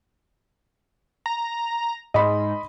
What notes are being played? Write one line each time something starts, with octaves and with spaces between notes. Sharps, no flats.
A#5
G#2 D#5 B5 C6